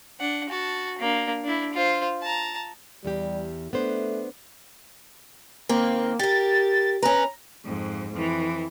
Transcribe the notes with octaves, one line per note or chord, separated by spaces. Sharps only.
D4 F#5
F#4 A5
A#3 D4
D4 E4
F4 C5
A5 A#5
E2 G3 G4
A3 B3 D4 C5
D#3 A#3 C4
G4 A#4 A6
C#4 B4 A#5
F2 G#2
F2 E3